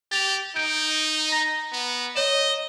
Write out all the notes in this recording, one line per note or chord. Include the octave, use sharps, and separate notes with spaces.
G4 A6 F7
D#4 G6 D7
A#5 A#6
B3
C#5 D#5 E7